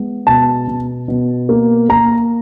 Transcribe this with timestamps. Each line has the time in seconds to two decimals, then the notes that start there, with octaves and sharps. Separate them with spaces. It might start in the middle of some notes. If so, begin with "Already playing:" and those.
Already playing: G#3 B3
0.27 B2 A5
0.68 B2
1.08 B2
1.49 A#3
1.89 A#3 A#5